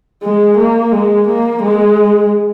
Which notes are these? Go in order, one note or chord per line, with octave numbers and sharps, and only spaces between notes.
G#3
A#3
G#3
A#3
G#3